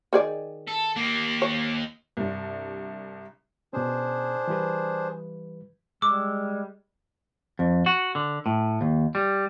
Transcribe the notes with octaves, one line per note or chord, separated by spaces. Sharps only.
D#3 G#4 D5
A4
D#2 A#3
C#5
C2 G2
B2 C#4 D4 G#4 C5
E3 G3 B4
G3 G#3 D6 E6
F2
F#4
D3
A2
D#2
G3